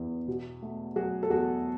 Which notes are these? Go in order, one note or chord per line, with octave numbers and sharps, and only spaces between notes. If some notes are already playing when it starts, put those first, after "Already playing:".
Already playing: E2 E3
B2
A3
F#3 F#4 G#4
A4
E2 F#4 G#4